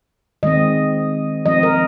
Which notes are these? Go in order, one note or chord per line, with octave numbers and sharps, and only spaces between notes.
D#3 G#3 C4 D#5
F3 C4 D#5
A#4